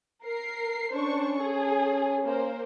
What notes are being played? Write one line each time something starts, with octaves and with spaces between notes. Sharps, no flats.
A#4 C7
C#4 D4 C5 C#6
G#4 A4
A#3 A#4 C5